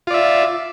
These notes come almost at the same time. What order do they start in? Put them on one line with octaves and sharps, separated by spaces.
F4 D5 E5